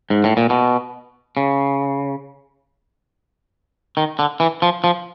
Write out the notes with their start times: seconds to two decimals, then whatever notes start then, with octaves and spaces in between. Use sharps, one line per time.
0.10 G#2
0.24 A2
0.37 A#2
0.50 B2
1.37 C#3
3.97 D#3
4.19 D3
4.40 E3
4.62 F3
4.84 F3